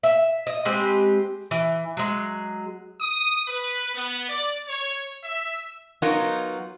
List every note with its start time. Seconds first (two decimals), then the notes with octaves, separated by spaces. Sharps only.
0.03 E5
0.47 D#5
0.65 G#3 C4 G4 B4
1.51 E3
1.97 F#3 G#3
3.01 D#6
3.48 B4
3.95 B3
4.29 D5
4.68 C#5
5.24 E5
6.02 F#3 B3 D#4 F4 F#4 A#4